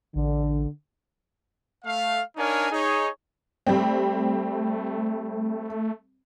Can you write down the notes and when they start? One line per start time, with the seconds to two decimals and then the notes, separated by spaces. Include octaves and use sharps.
0.15 A1 D3
1.84 A3 F5
2.37 D4 D#4 A#4 C#5 F5 G#5
2.72 D#4 G#4 C#5
3.67 G3 A3 C4